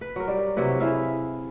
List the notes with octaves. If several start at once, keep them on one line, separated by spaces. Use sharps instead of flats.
B4
F#3 A#4
G3
C3 F#3 E4 B4
E4 G#4 E5 F5